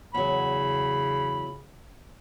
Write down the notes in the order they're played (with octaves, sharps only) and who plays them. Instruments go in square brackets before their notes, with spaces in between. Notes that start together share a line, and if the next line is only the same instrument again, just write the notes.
[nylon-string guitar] E2 F#3 [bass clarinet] C#3 [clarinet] B5